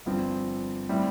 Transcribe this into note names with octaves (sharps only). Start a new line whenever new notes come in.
G1 G2 F3 C4
A2 G3 C4 E4